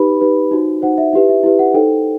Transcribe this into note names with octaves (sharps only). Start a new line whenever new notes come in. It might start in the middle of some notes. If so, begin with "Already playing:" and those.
Already playing: D#4 G4 B4 B5
D#4 G4 B4
D#4 F#4 C5
D#4 F#4 C5 F#5
E5
E4 G4 B4 E5
E5
E4 G4 B4
F#5
D#4 A4 C5 G5